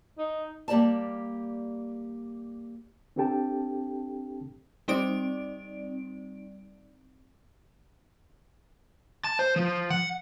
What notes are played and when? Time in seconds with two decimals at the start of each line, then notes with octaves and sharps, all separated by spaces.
0.18 D#4
0.68 G3 A#3 G4 D5 A5
3.16 C4 D4 G4 A4 G5 A5
4.88 G3 C4 D#4 D5 D7
9.24 A5
9.39 C5
9.56 F3
9.90 F#5